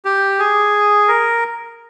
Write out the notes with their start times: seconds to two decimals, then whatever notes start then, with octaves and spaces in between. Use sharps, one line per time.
0.05 G4
0.39 G#4
1.08 A#4